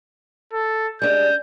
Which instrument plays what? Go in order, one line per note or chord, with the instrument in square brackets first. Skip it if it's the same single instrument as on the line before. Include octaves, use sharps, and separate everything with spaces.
[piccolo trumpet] A4
[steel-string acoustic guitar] G#3 D4 [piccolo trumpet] G6